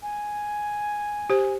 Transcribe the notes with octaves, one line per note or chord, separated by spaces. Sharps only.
G#5
G4 C5